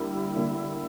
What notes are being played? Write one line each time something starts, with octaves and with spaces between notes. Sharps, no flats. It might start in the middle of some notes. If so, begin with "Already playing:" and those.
Already playing: D3 G3 A#3 E4
D3 G3 A#3